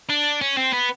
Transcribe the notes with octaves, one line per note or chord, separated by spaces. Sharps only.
D4
C#4
C4
B3